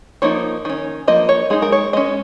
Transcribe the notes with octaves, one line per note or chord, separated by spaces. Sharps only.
F3 A#3 D#4 C#5
D#3 C#4
F3 A#3 D#5
C#5
G#3 D#4 G#4
A#4
C#5
G#3 C#4 D#5